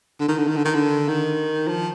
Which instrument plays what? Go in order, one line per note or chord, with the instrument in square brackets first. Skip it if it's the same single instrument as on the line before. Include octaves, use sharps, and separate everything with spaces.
[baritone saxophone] D3
D#3
D3
D#3
D3
D#3
D3
D#3
F3